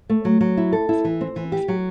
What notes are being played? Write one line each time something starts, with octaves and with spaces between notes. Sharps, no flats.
A3
F#3
F#3
E4
A4
E4
E3
C4
E3
G4
F#3